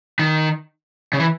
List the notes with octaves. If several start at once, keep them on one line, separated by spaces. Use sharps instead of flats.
D#3
C#3
E3